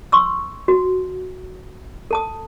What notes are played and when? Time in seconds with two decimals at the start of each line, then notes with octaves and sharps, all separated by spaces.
0.12 C6 C#6 E6
0.68 F#4
2.11 A4 A5 D#6